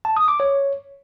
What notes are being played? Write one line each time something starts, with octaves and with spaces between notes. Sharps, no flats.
A5
D#6
D6
C#5